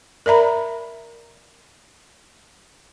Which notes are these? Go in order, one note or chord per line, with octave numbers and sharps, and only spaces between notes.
A#4 D5 E5 A#5 B5